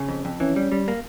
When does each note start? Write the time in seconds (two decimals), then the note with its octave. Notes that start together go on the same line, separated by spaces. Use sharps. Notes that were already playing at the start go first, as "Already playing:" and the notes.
Already playing: C#3
0.09 F2
0.25 F2
0.40 E3 C#4
0.56 G3
0.72 G3
0.88 A#3